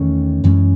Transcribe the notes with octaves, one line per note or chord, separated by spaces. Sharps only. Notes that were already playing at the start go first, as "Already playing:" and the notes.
Already playing: E2 D#3 A3 C#4
F#2 E3 G#3 C#4